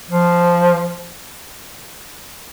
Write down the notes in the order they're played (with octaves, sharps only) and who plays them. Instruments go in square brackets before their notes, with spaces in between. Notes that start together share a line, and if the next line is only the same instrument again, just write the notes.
[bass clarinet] F3